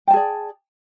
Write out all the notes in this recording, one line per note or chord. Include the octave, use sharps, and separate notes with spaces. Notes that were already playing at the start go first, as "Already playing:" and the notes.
G#4 D5 G5 A5